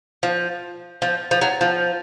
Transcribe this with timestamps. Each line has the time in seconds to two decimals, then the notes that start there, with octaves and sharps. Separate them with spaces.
0.23 F3
1.02 F3
1.31 F3
1.41 F#3
1.61 F3